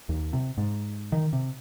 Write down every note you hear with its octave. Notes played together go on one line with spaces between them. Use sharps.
D#2
C3
G#2
D#3
C3